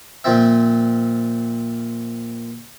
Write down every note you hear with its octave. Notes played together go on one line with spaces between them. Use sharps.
A#2 F3 C4 E5